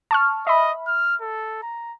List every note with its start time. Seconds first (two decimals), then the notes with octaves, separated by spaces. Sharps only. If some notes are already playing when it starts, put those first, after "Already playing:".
0.11 A5 C#6 F6
0.47 D#5 E5 B5
0.87 F6
1.21 A4
1.63 A#5